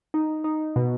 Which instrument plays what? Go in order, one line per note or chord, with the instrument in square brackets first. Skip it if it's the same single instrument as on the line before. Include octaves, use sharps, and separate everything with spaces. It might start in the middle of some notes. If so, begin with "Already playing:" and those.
[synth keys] D#4
D#4
B2